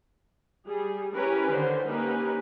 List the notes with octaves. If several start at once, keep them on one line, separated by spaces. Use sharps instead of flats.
G3 G#4
C#4 E4 G4 A#4 B4 C#5
D3 D#3 C5
A#3 C#4 D#4 G4 A#4 B4